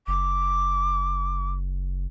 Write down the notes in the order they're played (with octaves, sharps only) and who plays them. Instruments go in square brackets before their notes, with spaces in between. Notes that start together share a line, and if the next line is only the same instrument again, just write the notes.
[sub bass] F#1 [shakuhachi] D6